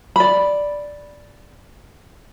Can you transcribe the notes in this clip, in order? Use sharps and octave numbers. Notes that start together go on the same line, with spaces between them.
D5 B5